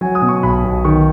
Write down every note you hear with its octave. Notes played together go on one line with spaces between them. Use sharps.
F#3 G#5
D#6
B2
C#6
B1 B5
B1
D#3 C#6